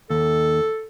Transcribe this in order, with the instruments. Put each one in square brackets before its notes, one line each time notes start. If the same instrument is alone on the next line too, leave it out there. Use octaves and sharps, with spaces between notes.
[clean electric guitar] D#2 [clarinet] A4